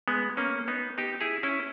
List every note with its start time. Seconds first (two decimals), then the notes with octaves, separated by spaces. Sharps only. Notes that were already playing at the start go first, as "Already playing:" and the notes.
0.08 G#3 B3
0.37 A#3 C#4
0.68 B3 D#4
0.98 D#4 G4
1.21 E4 G#4
1.43 C#4 E4